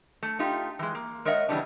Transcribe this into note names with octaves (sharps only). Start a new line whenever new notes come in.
A3
A3 D#4 F4 G4
E3 G#3
A#3
G#3 A#4 C#5 D#5 E5 F#5
C#3 E3 G3 B3 D4